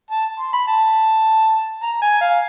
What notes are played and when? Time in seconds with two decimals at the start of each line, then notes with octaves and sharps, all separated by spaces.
0.11 A5
0.40 C6
0.53 B5
0.68 A5
1.83 A#5
2.02 G#5
2.21 F5